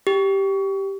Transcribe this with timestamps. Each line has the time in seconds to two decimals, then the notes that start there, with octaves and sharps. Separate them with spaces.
0.07 G4